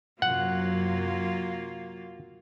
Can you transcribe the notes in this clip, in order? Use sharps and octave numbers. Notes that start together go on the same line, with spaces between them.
F#2 C3 F#3 A#3 F4 F#5